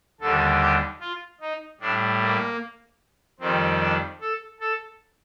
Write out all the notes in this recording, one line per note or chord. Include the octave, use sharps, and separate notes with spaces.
D#2 D3 G3 A4
G4
F4
D#4
A2 G3 D4
A#3
F2 D#3 G3 C4
D4
A4
A4